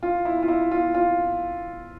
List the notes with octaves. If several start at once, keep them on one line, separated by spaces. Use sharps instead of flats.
F4
E4
F4
E4
F4
F4